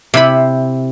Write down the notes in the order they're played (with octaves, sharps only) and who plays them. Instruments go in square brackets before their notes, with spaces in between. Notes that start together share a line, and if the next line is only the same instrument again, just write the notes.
[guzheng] C3 E4 B5